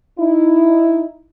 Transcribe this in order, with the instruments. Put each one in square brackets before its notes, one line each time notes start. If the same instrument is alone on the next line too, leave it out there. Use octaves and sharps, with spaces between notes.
[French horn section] D#4 E4